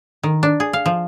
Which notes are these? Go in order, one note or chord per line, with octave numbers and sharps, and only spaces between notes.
D#3
D4
G#4
F5
F3